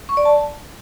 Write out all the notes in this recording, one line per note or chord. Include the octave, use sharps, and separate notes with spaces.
C#6
D5
A5